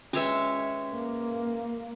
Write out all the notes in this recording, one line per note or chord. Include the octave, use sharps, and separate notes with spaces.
G#3 C#4 B4 C#5 E5
A#3